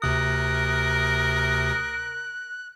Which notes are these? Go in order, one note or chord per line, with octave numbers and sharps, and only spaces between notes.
D2 C3 A#4 D#6 F#6